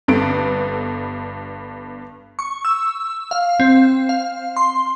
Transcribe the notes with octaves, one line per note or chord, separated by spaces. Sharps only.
G1 G2 B3 A4 D7
C#6
E6
F5
C4
F5
C6